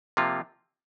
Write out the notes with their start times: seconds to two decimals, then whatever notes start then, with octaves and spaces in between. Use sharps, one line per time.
0.17 C3 F3 A#3 F4